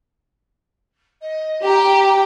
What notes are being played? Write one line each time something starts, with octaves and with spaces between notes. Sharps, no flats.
D#5
G4 A#5